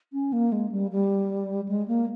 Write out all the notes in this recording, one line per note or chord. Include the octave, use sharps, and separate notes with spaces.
C#4
A#3
G#3
G3
G3
G#3
A#3